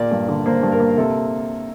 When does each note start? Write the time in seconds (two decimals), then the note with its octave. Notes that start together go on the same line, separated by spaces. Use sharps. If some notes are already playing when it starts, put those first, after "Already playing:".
Already playing: A#2 A#3 D5
0.11 G2
0.28 D3
0.46 A#3 C5
0.63 G2
0.72 A#4
0.80 A#3
0.97 C3 A4